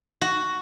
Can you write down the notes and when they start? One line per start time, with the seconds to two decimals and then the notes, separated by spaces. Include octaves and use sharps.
0.21 F#4